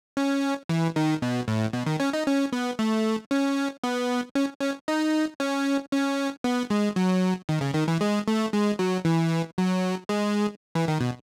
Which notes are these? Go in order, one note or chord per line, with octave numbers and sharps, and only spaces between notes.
C#4
E3
D#3
B2
A2
B2
D#3
C#4
D#4
C#4
B3
A3
C#4
B3
C#4
C#4
D#4
C#4
C#4
B3
G#3
F#3
D#3
C#3
D#3
E3
G#3
A3
G#3
F#3
E3
F#3
G#3
E3
D#3
B2